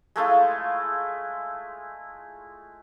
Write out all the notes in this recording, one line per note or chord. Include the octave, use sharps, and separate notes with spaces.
G#3 A3 E4 F4